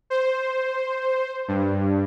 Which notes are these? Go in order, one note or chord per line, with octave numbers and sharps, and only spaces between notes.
C5
G2